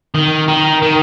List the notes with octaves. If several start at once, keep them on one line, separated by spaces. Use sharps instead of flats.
D#3
D#3
D#3